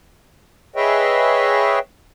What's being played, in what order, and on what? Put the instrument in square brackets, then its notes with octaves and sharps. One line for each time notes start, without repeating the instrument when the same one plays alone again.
[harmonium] G#4 B4 C#5 D#5 E5 G5